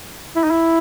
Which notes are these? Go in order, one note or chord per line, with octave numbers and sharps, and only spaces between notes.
E4
D#4
E4